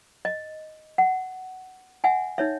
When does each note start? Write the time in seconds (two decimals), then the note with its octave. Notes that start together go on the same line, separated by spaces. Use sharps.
0.25 D#5
0.98 F#5
2.04 E5 F#5 G#5
2.38 D#4 C#5 E5